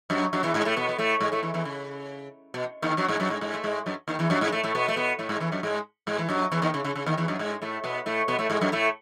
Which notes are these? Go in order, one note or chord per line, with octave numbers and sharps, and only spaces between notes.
F#2 F#3
F#2 F#3
E2 E3
G#2 G#3
A2 A3
B2 B3
B3
A2 A3
G#2 G#3
A2 A3
E2 E3
E2 E3
C#3
B2
D#2 D#3
F#2 F#3
G#2 G#3
F#2 F#3
G#2 G#3
G#2 G#3
A3
G#2 G#3
F#2 F#3
D#2 D#3
E2 E3
F#2 F#3
G#2 G#3
A2 A3
A2 A3
B2 B3
A3
B2 B3
A2 A3
G#2 G#3
E2 E3
F#2 F#3
G#2 G#3
G#2 G#3
E3
F#2 F#3
E2 E3
D#2 D#3
C#3
C#3
C#3
D#2 D#3
E2 E3
F#2 F#3
G#2 G#3
A2 A3
B2 B3
A2 A3
B2 B3
A2 A3
G#2 G#3
F#2 F#3
A2 A3